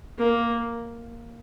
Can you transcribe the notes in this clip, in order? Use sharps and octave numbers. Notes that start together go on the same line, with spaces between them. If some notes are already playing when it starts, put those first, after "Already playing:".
A#3